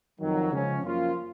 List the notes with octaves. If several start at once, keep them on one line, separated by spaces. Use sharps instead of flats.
F2 D#3 F#3
C#3 F3 G#3 C#4
F#2 F3 A#3 C#4 F4